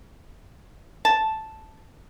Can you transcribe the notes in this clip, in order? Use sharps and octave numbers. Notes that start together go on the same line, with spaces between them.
A5